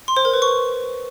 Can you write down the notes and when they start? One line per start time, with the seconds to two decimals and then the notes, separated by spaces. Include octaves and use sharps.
0.08 C6
0.17 C5
0.25 A#4
0.34 B4
0.42 C#6